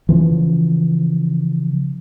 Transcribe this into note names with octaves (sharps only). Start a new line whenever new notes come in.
C#3 E3 F3